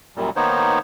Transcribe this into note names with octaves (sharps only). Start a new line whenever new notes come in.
F#2 A#2 G3
D#3 A#3 B3 D#4 C5 C#5